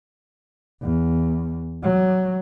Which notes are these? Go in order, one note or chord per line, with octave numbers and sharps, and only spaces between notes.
E2
F#3